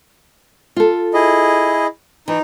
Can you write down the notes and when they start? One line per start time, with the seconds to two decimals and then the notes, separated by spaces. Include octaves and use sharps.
0.76 F4 A4
1.14 E4 G#4 D#5
2.28 E3 D#4